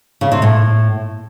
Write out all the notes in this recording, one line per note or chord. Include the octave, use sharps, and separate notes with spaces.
C#3
C3
A2